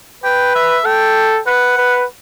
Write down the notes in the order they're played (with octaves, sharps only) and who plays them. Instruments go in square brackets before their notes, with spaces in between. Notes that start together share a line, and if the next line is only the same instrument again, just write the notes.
[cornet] B4 [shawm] G5
[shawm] E5
[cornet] A4 [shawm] G5
[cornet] B4 [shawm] F#5
[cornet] B4